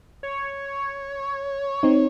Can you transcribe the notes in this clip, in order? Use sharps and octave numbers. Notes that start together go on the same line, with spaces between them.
C#5
C4 D#4